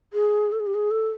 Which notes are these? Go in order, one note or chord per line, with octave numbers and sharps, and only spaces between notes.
G#4
A4
G#4
G4
G#4
A4